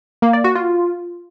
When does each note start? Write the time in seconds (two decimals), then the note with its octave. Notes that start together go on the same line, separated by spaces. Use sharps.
0.22 A#3
0.33 D5
0.44 F#4
0.55 F4